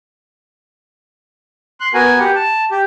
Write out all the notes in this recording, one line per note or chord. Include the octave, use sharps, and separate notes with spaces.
C6 F#6
B3 F#4 A#4 G#5
G4 F#5
A5
G4